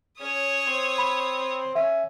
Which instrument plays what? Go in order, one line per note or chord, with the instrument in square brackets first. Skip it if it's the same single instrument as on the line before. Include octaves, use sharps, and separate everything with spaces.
[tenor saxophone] C#4 [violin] C#5 D#6
[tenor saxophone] C4
[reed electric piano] B5
[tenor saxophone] C#4 [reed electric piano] E5